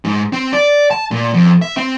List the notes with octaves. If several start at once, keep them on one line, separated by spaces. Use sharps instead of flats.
G#2
C4
D5
A5
A#2
F2
E5
C4